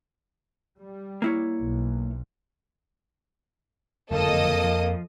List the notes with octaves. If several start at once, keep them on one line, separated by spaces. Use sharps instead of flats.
G3
A#3 E4 C#5
B1
F#1 F2 D3 F#3 A#3 A4 D#5 D#6
F3